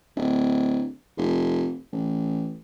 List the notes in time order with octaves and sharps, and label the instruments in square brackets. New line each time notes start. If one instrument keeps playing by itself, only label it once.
[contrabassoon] D1
F1
A1